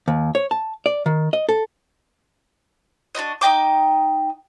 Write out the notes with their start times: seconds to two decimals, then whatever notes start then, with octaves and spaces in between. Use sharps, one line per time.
0.08 D#2
0.35 C#5
0.51 A5
0.86 D5
1.06 D#3
1.33 D#5
1.49 A4
3.15 D4 F#4 B4 D#5
3.41 D#4 D#5 G5 D6